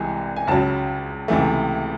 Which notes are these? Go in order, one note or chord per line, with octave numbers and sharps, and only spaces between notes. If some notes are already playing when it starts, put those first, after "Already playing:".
Already playing: C2 C3 E3 G#3 G#5
G#5
C#2 C#3 F#3 A5
C#2 C3 E3 A3